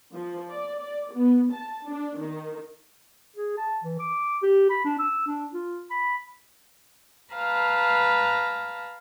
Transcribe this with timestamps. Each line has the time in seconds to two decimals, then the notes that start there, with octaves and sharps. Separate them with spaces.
0.14 F3
0.51 D5
0.82 D5
1.15 B3
1.53 A5
1.87 D4
2.18 D#3
3.37 G#4
3.57 A5
3.84 E3
3.99 D6
4.43 G4
4.70 B5
4.85 D4
4.99 E6
5.27 D4
5.54 F4
5.91 B5
7.34 B4 F5 A5 A#5